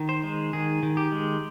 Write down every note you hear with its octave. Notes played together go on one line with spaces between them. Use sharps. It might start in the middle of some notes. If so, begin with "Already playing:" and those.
Already playing: D#3
C5
G#3
D#3 G#4
D#3
G4
G#3